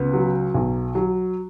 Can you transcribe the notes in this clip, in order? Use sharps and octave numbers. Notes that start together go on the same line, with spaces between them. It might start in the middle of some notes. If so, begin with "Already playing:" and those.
Already playing: C#2 B3
F#3
B1
F#3